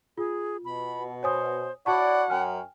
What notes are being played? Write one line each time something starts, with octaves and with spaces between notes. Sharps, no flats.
F4 G#4
B2 B5
C5 C#5 G#5 D#6
E4 F#4 C#5 D5 F#5 A5 C#6
F#2 G5 G#5 F6